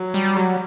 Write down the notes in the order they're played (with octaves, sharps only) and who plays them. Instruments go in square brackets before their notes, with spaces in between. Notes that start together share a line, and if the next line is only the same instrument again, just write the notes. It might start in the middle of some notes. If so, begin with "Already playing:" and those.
Already playing: [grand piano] F#3
[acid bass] G3
[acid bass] F#3 [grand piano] G3